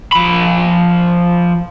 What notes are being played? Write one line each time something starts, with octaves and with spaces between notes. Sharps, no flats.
F3 B5